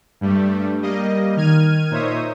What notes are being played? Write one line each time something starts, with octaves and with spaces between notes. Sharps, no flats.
G2 G3 A3
G3 A#3 D#5
D#3 F6 G#6 D#7
A#2 D#4 C5 C#5 E5 D#6